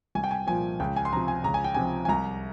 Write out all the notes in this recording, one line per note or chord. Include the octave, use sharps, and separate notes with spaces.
C2 G#5
G5
G#5
A#2 F3 G#5
C#2 G5
G#5
C6
C3 F3 A#5
G#5
C#2 A#5
G#5
G5
C3 F3 G#5
G#5
C2 A#5